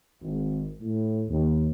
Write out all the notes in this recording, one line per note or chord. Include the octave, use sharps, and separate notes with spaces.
G#1
A2
D#2